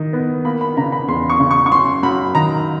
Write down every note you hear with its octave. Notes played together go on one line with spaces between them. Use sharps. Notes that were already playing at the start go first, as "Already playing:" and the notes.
Already playing: D#3
B3
A#3 B5
B5
C#3 A#5
B5
E2 C6
C#6
C#3
C#6
C#6
F#2 C6
F#2 B5
D#3 A#5